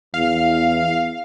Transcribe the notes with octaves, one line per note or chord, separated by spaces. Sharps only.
E2 F5